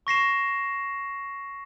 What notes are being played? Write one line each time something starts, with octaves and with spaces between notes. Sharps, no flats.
C#6 A#6 C7 E7